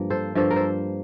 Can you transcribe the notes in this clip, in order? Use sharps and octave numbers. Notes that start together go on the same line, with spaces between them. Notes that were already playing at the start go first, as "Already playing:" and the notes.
Already playing: G2 F3 A#3
A4 C5
G2 F3 A#3 A4 C5
A#4
A4 C5